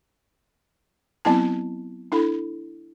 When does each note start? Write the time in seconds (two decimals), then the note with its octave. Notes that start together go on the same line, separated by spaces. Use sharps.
1.25 F#3 B3 C4 E4 A5
2.12 D4 E4 A4